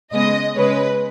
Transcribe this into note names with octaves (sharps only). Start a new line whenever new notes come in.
C#3 G#3 B3 D#5
C#3 G#3 C#4 B4